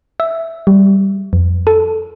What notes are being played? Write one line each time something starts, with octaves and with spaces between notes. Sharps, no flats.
E5
G3
F2
A4